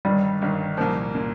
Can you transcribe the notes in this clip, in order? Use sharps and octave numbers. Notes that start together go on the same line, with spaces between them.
G1 G2 D#3 G3
G1 G2 D#3
C2 A#2 F3 A#3
A#2 A#3